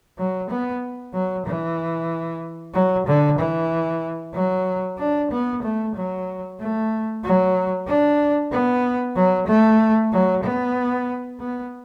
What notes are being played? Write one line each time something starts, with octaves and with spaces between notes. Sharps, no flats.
F#3
B3
F#3
E3
F#3
D3
E3
F#3
D4
B3
A3
F#3
A3
F#3
D4
B3
F#3
A3
F#3
B3
B3